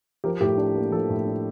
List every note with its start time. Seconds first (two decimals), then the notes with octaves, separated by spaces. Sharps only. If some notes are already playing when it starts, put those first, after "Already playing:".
0.24 F3 G4 A#4
0.41 A2 G4
0.57 D4
0.76 A#3
0.92 F3 A4
1.10 A2
1.26 D4